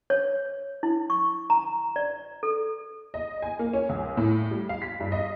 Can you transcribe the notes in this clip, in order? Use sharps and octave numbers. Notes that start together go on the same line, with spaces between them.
C#5
E4
C#6
A#5
D5
A4
D#5
G#5
A#3
C#4
C#2
A2
G3
F5
B6
G2
D#5